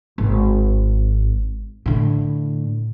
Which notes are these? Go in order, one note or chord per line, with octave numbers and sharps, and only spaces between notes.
G#1
A2 D3